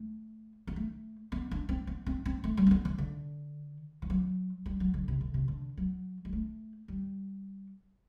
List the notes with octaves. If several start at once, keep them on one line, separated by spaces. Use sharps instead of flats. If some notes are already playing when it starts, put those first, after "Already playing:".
Already playing: A3
B3
A3
B3
D4
C4
B3
C4
C4
A3
G3
C4
B3
E3
D3
E3
F#3
G3
F#3
D3
C3
D3
C3
D3
F#3
G3
A3
G3